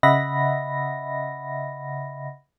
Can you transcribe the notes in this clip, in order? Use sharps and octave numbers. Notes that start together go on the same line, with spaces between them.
C#3 D#5 E5 F#5 B5 A#6